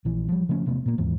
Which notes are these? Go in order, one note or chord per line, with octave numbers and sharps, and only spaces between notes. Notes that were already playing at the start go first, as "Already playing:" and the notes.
A#1 E3
F3 G3
C#3 F3 A3 C#4
E1 C3 A3 B3
A#2 A#3
D#2 G#2 E3